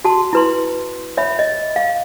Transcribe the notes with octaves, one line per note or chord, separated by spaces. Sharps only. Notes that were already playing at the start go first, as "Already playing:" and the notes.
F#4 A5 C6
E4 B4 C6
C#5 E5 B5
D#5
F5